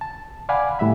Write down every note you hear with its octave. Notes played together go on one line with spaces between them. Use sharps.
A5
D5 F5 F#5 G#5 B5 D6
A2 G3 E5 B5